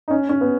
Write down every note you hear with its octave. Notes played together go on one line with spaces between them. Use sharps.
D#4
C#4
C#4
B3